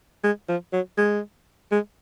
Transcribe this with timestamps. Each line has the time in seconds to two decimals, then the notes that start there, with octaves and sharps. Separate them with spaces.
0.24 G#3
0.48 F3
0.73 F#3
0.97 G#3
1.71 G#3